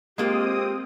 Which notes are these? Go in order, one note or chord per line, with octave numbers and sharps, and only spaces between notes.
G#3 A#3 C4 F4 G4 D#6